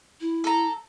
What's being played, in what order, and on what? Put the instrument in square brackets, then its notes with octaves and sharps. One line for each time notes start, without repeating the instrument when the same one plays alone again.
[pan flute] E4
[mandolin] A4 A#5